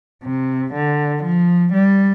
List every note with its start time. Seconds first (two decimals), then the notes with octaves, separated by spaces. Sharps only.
0.24 C3
0.74 D3
1.23 F3
1.73 G3